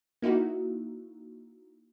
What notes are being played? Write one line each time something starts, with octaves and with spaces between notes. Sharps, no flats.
A#3 D#4 E4 F#4